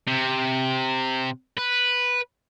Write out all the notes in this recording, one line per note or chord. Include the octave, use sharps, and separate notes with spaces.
C3
B4